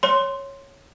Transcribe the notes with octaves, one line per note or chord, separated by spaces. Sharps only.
C#5 C6